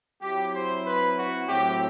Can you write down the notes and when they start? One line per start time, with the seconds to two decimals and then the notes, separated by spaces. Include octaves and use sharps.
0.21 F#3 C4 E4 G4
0.54 C5
0.85 B4
1.16 F#4
1.48 A2 F#3 C4 G4